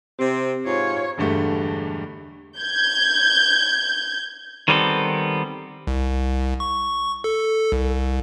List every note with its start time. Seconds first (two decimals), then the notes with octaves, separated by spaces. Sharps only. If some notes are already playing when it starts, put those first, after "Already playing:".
0.19 C3 C4 G4 C5
0.66 G#2 F4 C#5
1.18 E1 G2 D3 G3 A3
2.58 G6 G#6
4.68 D#3 G3 B3 C4 G#4 A4
5.87 C2
6.60 C#6
7.24 A4
7.72 C2